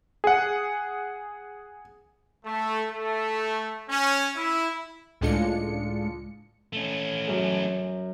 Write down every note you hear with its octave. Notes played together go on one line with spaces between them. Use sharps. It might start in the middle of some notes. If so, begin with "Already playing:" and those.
G#4 F#5
A3
A3
C#4
E4
C#2 A2 G#3 D4 F4 C#7
A3 C#4
F#2 G#4